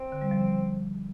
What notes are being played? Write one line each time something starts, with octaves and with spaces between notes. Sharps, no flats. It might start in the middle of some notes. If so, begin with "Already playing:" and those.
Already playing: C4
D3
G3
F3